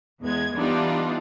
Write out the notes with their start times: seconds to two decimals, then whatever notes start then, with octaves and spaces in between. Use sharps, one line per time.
0.22 E2 G#3 B3 G#6
0.55 E3 G3 B3 D4 D#4 F4